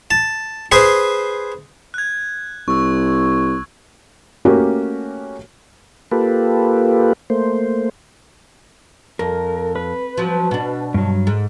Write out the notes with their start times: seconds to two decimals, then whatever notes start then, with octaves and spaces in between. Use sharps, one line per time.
0.11 A5
0.72 G#4 B4 C5 G#5
1.94 F#6 G#6
2.68 C2 C#6 E6
4.45 A3 A#3 C#4 F#4 G4 A#4
6.12 A#3 F4 G4 A4 B4
7.30 A3 A#3 C5
9.19 F2 A#4
9.76 B4
10.17 F3 F#3
10.51 B2 D4
10.94 G2 F#3
11.27 G#2